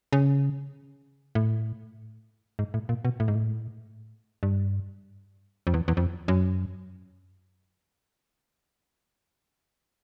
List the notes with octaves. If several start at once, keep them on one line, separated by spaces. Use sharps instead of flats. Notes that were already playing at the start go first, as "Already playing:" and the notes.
C#3
A2
G#2
A2
A#2
B2
A2
G#2
A2
G2
F2
E2
E2
F2
F#2